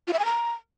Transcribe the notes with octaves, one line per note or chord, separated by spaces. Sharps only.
F4
E5
G#5
A#5